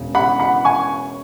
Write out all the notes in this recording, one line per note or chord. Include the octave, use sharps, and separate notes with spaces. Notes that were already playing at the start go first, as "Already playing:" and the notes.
Already playing: E1 C#3 E3
F#5 B5
F#5 B5
G#5 C#6